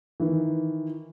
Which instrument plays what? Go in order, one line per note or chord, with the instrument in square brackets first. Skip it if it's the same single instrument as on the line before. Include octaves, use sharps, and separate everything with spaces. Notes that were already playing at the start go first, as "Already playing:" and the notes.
[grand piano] D#3 E3